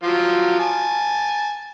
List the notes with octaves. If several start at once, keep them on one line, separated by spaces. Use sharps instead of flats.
F3 F#3 F4
G#5 A5